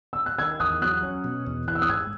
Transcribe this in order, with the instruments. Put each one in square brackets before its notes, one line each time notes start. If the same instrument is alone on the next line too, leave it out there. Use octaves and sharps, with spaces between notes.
[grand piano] E6
F#6
[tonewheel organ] D#3 [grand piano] E6 G#6
[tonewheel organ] E2 [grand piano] D#6 F#6
[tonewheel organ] F#3 [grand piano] D#6 F#6
[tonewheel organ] C#4
B2
E2
[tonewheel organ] E3 [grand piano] F#6
[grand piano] E6
D#6 F#6
[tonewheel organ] G#2 [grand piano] E6 G#6